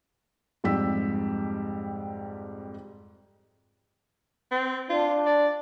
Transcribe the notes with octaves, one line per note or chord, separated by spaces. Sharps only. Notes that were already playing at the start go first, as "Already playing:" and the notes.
F2 G#2 G3 G4 E6 B6
C4
D4 F4
D5